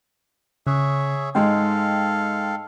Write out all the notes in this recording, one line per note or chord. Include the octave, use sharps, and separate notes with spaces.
C#3 G#4 C#5 E5
G#2 G#3 A4 F5 G5